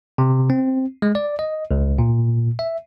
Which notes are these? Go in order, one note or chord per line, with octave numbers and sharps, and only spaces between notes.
C3
C4
G#3
D5
D#5
C#2
A#2
E5